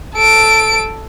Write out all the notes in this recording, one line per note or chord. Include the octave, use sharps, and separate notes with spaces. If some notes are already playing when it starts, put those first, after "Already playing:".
A4 D7